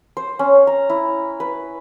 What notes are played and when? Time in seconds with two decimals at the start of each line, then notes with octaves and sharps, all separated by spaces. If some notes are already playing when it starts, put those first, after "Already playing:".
0.17 C5
0.39 C#4
0.67 A#5
0.90 E4
1.40 B4